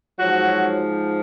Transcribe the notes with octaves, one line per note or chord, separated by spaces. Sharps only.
G#2 F3 F#3 F#4